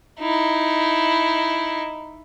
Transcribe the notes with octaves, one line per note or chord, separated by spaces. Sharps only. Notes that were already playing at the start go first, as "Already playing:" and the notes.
D#4 E4